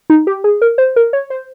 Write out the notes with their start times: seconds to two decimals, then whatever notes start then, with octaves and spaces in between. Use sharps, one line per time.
0.10 D#4
0.27 G4
0.44 G#4
0.62 A#4
0.78 C5
0.96 A#4
1.13 C#5
1.30 C5